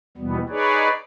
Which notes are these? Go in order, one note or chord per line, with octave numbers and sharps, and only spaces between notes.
D#2 B2 E3 G3 B3
D#4 G#4 B4 C#5 D5